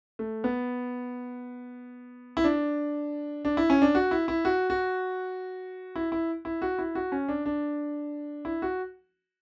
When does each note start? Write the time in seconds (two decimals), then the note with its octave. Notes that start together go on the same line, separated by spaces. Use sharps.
0.19 A3
0.44 B3
2.37 E4
2.44 D4
3.45 D4
3.57 E4
3.70 C#4
3.82 D4
3.95 F#4
4.11 E4
4.28 E4
4.45 F#4
4.70 F#4
5.96 E4
6.12 E4
6.45 E4
6.62 F#4
6.78 E4
6.95 F#4
7.12 C#4
7.28 D4
7.46 D4
8.45 E4
8.62 F#4